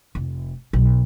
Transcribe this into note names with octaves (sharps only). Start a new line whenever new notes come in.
F1
B1